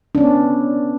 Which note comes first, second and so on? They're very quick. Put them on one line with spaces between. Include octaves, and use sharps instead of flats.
D4 C#4 B3